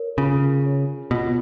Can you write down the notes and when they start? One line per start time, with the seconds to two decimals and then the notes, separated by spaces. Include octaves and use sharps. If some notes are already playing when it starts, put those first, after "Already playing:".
Already playing: A#4 C#5
0.18 C#3 F4
0.65 A#4 C#5
1.11 B2 F4